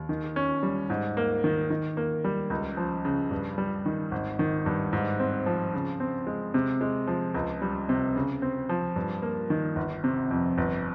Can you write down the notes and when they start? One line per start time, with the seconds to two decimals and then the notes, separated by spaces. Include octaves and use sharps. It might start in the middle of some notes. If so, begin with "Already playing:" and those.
Already playing: D#2
0.09 D#3
0.36 C#4
0.63 G3
0.90 G#2
1.17 A#3
1.44 D#3
1.70 D#3
1.97 A#3
2.24 G3
2.50 C#2
2.77 F3
3.05 C#3
3.31 G2
3.58 G3
3.86 D#3
4.12 G#1
4.39 D#3
4.66 G2
4.93 G#2
5.20 C4
5.46 F3
5.74 C#3
6.00 C4
6.27 G#3
6.54 C3
6.81 G#3
7.07 F3
7.34 C#2
7.62 G3
7.89 C3
8.16 C#3
8.42 C4
8.69 F3
8.96 G2
9.22 A#3
9.50 D#3
9.76 G1
10.04 C3
10.31 F2
10.58 G1